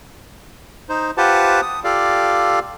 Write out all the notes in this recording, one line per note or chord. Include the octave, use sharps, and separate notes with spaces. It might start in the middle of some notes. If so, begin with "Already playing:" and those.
D#4 C5
F4 G4 B4 C5 F#5 A5
D#6
F4 G4 A4 D5 F5